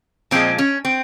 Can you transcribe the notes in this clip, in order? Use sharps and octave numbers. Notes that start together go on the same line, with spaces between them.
A#2 F3 G#3 C4
C#4
C4